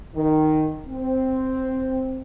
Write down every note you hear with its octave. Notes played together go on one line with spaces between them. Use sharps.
D#3
C4